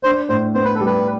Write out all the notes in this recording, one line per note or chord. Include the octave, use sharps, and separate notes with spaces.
D4 C5
A2 C5
B3 C5
B4
A4
G3
B4